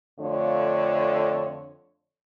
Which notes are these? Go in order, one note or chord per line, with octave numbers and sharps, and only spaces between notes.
F2 D3 A3 F4 C#5